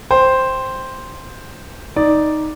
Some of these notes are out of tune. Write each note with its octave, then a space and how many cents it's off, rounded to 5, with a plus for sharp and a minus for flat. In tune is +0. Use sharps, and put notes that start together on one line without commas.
C5 +0 G5 +5
D#4 +0 D5 +0